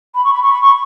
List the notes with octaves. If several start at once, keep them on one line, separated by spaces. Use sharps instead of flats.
B5
C#6
B5
C#6
B5
C#6